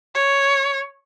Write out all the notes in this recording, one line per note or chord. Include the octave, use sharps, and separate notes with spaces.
C#5